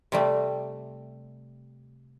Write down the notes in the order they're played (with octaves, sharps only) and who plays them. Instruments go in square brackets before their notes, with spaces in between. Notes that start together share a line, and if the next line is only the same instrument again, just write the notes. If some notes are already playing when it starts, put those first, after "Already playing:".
[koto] C3 G3 A3